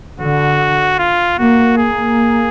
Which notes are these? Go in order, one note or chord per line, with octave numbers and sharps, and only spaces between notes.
D3 F#4
F4
A#3 F#4
A#3 G#4